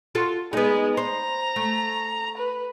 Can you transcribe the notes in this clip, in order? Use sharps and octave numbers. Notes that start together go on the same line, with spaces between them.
F4 F#4 A4
G#3 B3 D#4
C5 A#5
A3
B4